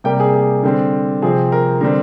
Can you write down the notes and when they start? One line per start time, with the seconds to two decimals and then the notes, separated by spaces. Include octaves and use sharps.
0.04 C3 G3 A#3 G5
0.20 G#4
0.34 G#4
0.63 D3 G3 C4
1.22 C3 F3 C4 G#4
1.52 A#4
1.81 D3 G3 C4 A#4